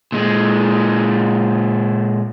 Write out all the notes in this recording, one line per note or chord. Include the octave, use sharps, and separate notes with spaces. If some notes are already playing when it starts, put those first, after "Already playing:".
A#2 G#3